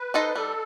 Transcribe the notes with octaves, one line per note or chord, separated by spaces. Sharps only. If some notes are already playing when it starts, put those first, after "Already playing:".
Already playing: B4
D#4 A4 C5 D#5
G3 A4